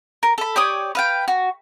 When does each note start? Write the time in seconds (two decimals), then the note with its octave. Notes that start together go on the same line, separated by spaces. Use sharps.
0.23 A#4
0.38 A4 B5
0.56 G4 C#5 D5 D#6
0.95 B4 F5 G5
1.28 F#4